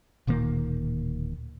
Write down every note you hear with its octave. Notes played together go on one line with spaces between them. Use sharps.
D1 A#2 D#3 A#3